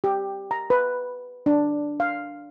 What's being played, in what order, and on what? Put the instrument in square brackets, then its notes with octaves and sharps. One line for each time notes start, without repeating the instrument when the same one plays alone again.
[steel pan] G4
A#5
B4
D4
F5